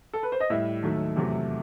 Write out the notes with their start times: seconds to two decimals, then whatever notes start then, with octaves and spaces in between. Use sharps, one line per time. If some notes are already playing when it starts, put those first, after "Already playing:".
0.13 A4
0.23 B4
0.32 C5
0.40 D#5
0.50 A2 G3 E5
0.83 D#2 D#3 F#3 A3
1.16 E2 C3 F#3 A3